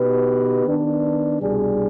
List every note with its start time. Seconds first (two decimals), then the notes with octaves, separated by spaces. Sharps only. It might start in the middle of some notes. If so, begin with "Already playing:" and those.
Already playing: B2 B3 D#4 G4 B4
0.66 D#3 B3 D4
1.39 C2 B2 G3 D4 G#4